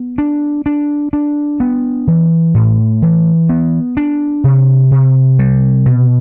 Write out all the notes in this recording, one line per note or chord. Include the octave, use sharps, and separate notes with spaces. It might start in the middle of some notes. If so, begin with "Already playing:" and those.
Already playing: B3
D4
D4
D4
B3
E3
A2
E3
B3
D4
C3
C3
G3
B2